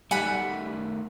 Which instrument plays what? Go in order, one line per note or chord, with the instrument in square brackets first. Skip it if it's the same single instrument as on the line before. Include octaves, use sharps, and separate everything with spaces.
[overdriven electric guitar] D#3 A3 [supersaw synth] G3 [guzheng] F#5 B5 [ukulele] G#5